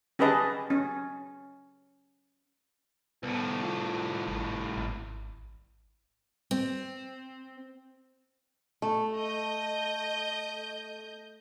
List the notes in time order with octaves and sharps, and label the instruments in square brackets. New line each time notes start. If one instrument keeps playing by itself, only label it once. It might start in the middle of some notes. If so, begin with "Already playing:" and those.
[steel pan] C#4 G4 G#4 B4 D#5 A5
C#4
[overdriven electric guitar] C2 A2 [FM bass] B3
[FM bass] F4
G#1
G#1
[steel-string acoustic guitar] C4
A3
[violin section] D#5 G6